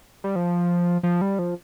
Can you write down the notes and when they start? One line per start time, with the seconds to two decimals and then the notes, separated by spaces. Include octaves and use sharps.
0.24 G3
0.36 F3
1.03 F3
1.21 G3
1.39 F3